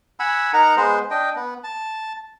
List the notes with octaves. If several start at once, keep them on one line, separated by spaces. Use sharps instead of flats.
F#5 G#5 B5 E6
D#4 A#4 F#5 A#5
G#3 B3 C5
D4 D#5 G5
B3
A5